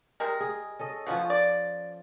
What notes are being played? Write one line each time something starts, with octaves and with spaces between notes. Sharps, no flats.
G3 G#3 A#4
G#4
C#4 A4 D#5
B2 F3 B3 C#4 F4
D5